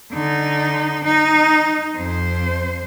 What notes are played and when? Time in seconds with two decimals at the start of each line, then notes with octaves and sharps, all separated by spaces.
0.12 D3 D#4
1.05 D#4
1.95 F2 C5